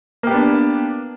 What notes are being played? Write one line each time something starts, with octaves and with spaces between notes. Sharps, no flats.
A#3 B3 D4 G4